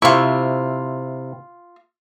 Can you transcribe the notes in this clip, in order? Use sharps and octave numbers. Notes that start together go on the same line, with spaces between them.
C3 E4 F4 C#6